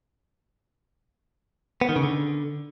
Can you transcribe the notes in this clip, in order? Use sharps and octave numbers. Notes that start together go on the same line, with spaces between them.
B3
D#3
C#3
D3